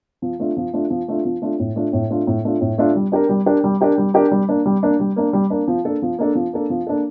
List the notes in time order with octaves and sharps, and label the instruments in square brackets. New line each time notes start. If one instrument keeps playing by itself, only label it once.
[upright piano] F3
A3 D4 F4
F3
A3 D4 F4
F3
A3 D4 F4
F3
A3 D4 F4
A2
A3 D4 F4
A2
A3 D4 F4
A2
A3 D4 F4
A2
A3 D4 F4
G3
D4 G4 A#4
G3
D4 G4 A#4
G3
D4 G4 A#4
G3
D4 G4 A#4
G3
A#3 D4
G3
A#3 D4
G3
A#3 D4
G3
A#3 D4
F3
A#3 D4 A4
F3
A#3 D4 A4
F3
A#3 D4 A4
F3
A#3 D4 A4